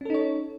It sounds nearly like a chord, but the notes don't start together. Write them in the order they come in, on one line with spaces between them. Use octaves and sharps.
C#4 A4 D#4 C#5